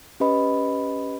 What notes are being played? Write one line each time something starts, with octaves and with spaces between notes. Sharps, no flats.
C#4 G4 B4 D#5 B5